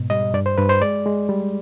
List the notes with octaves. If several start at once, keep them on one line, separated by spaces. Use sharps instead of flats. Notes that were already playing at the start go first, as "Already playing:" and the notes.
Already playing: G#2 B2
G3 D#5
G2 D5
C5
G2 B4
C5
G#3 D5
G#3
G3